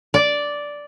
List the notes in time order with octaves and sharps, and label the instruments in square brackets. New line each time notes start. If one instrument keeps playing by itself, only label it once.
[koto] D5